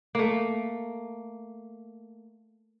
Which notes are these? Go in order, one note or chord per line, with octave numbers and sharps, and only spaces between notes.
A3 A#3